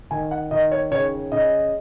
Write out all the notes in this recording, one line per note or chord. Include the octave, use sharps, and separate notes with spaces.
D#3 G#5
F#5
D#3 D#5
C#5
C#3 C#5
C#3 D#5